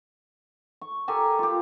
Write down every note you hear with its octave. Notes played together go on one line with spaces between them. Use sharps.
C#6
G4 A4 A#4 G#5
F4 G4